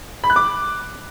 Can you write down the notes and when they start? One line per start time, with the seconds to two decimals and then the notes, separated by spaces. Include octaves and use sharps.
0.24 B5
0.30 F#6
0.36 D6